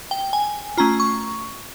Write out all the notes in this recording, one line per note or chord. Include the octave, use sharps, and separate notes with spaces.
G5
G#5
A3 C#4 F4 A#5
C#6